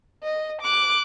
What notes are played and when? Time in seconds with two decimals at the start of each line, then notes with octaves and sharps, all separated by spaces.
0.23 D#5
0.62 D6 F#6